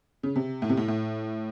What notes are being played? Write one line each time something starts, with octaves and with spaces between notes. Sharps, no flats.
C#3
C3
A2
C3
A2
A2